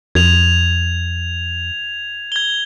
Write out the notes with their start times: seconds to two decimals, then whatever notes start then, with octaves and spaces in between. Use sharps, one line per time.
0.15 F2 G#6 F7
2.32 G#6 G7